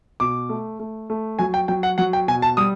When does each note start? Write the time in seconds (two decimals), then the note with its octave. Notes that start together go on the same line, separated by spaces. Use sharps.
0.20 B2 D6
0.49 A3
0.80 A3
1.10 A3
1.39 F#3 G#5
1.54 G5
1.68 F#3 G5
1.83 F#5
1.98 F#3 F#5
2.13 G5
2.28 B2 G#5
2.42 A5
2.57 G3 D#6